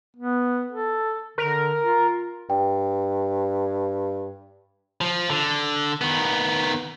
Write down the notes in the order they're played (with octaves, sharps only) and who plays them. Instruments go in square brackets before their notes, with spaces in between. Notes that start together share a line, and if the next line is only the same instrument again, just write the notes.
[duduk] B3
A4
[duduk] D3 [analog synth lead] A#4
[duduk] F4
[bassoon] G2 [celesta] G5
[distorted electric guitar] F3
D3
D#3 B3